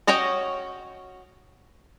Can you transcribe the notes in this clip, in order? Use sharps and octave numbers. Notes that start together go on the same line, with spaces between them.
C#4 F#4 C#5 D#5 G5